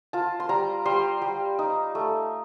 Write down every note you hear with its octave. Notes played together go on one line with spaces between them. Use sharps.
F4 A5
C6
G3 A#5
G3 C6
G3
D#4
A3